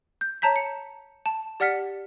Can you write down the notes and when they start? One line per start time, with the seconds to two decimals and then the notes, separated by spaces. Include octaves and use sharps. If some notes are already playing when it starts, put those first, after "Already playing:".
0.21 G6
0.42 C#5 A5 A#5 G6 B6
0.56 C#7
1.26 A5
1.60 G4 D5 F#5 F6 B6 C#7